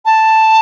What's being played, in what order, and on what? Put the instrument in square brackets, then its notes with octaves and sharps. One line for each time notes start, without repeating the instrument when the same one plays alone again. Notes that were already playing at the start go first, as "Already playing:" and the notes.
[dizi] A5